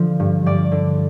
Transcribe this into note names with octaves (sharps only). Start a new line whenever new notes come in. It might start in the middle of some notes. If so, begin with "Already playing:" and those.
Already playing: D3 F3
G2
G2 D5
D3